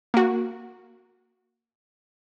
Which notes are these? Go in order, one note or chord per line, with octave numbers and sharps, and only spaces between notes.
A#3 F#4